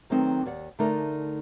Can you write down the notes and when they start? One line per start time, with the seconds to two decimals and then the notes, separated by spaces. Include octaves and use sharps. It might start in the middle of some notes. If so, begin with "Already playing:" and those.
0.10 D#3 F#3 A3 B3 C4 D#4
0.46 D#2 D5 F#5
0.79 D3 A3 D#4 A#4 D5